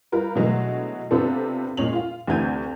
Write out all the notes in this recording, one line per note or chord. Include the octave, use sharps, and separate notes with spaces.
G3 F4 A#4 B4
B2 D3 E3 F#3 G#3 A3
C3 B3 C4 D4 F4 A4
A#2 G#3 C#4 F7 F#7
F4 F5
D2 C3 E3 G6 G#6 D#7